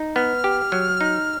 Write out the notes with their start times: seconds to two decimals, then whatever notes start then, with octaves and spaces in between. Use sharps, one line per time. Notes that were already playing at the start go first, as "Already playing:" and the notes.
Already playing: D#4
0.15 B3 F6
0.44 G4
0.72 F#3
1.01 D#4